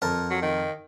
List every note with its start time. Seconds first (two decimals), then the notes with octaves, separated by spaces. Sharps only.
0.02 F2 A#4 A5
0.31 F#3
0.42 D#3